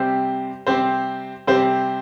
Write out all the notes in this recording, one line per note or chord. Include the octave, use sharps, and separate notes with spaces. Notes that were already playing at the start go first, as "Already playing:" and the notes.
Already playing: C3 G3 C4 G4 C5
C3 G3 C4 G4 C5
C3 G3 C4 G4 C5